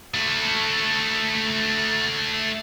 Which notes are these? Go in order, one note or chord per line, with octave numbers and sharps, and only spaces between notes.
A3 F#4